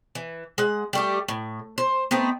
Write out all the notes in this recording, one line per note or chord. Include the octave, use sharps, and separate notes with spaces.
E3
G#3 F#5
G3 A3 G4
A2
C5
A3 B3 C4 D#4